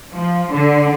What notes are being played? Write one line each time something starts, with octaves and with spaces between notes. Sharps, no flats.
F3
D3